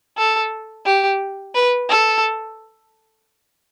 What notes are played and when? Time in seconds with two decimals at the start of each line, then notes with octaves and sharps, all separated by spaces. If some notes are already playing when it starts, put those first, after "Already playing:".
0.18 A4
0.86 G4
1.55 B4
1.89 A4